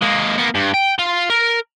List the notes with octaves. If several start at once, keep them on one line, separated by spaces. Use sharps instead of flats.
G#3 A#3
A#3 B3
G2
G5
F4
A#4